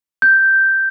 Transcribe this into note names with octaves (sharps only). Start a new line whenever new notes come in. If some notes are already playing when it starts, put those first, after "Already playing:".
G6